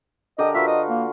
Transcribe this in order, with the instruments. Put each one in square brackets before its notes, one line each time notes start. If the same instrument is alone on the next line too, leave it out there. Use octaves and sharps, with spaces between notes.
[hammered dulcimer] D3 G4 A#4 [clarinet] D#5
[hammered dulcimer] F4 F#4 B4 [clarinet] E5
[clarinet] D#5
A#3